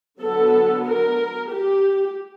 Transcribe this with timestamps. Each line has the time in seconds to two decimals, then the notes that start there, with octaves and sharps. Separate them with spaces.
0.20 D3 F#3 B3 A4
0.84 A#4
1.48 G4